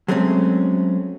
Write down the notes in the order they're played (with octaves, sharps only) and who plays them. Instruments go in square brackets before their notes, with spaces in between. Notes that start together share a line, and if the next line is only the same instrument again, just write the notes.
[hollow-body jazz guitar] F#3 G#3 A3 C4 C#4